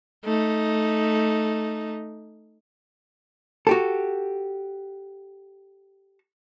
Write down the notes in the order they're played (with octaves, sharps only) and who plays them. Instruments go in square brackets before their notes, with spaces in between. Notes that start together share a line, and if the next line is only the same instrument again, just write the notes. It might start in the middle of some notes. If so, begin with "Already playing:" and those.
[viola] A3 D#4
[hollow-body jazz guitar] F#4 G4 A4